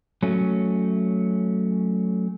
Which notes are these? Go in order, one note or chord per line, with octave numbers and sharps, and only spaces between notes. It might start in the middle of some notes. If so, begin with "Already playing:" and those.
F#3 A3 C#4